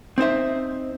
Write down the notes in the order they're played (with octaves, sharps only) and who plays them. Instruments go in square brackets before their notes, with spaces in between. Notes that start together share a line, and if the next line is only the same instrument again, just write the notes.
[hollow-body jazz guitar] C4 D#4 C5 E5